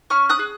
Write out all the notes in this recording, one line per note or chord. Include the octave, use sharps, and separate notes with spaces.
C#4 C#6 F6
D#6 F#6
G#4